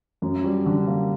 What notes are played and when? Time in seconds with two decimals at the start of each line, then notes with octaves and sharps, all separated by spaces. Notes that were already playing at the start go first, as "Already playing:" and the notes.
0.22 F#2
0.44 G3
0.66 D3
0.87 A#3